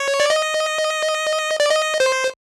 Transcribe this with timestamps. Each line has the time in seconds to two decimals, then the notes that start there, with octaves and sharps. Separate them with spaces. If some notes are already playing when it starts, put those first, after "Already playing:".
Already playing: C#5
0.20 D5
0.30 D#5
1.60 D5
1.70 D#5
2.00 C5